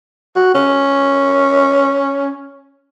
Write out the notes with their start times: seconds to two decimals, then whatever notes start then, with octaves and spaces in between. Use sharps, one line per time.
0.36 F#4
0.54 C#4